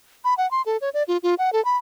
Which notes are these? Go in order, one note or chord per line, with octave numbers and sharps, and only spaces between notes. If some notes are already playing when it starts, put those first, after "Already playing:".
B5
F#5
C6
A4
C#5
D5
F4
F4
F#5
A4
B5